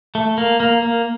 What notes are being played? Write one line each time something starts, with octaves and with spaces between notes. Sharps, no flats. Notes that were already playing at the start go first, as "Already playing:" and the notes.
A3
A#3
A#3
A#3